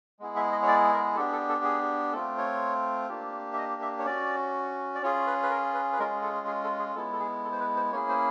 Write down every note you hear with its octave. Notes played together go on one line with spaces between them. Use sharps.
G#3 B3 E4 G#4
E5
D#5
C#5
D5
A#4
B3 D4 G4 A4
A4
A4
G#4
A3 C4 F4 A4
C#5
A#3 D4 G4
E5
D#5
E5
C#5
C#4 F#4 D5
D5
C#4 F4 G#4 C#5
B4
B4
A#4
B4
B4
G#3 C#4 F4 G#4 A#4
A4
G#4
A4
G#4
G#3 B3 E4 A4
A4
G#4
A4
C5
B4
C5
A#3 C#4 E4 G#4 C#5
C5